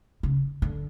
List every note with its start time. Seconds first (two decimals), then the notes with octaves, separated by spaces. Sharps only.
0.23 C#3
0.62 D3